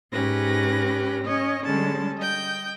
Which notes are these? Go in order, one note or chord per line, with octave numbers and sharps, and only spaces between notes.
G#2 C#4 G4 B4 A#6
C#4 C#5 D#5
D3 G3 G#3 C#4 A5
D#5 G5 G6